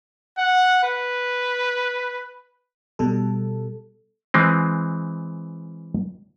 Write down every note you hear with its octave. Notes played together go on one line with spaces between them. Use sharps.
F#5
B4
B2 G3 A4
E3 G#3 C4